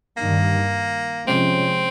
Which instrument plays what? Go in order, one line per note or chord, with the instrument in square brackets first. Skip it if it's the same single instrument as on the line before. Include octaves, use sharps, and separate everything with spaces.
[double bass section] G2 D#3 G3 [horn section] A#3
[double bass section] C3 F3 G#3 C#4 [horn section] C4